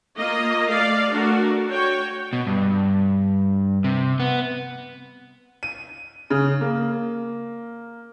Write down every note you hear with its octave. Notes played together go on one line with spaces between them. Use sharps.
A#3 F4 D#5
A3 D5 F5
A3 D4 F#4 A#4
F#4 C#5 G5
B2
G2
C3
B3
D#7
C#3
A#3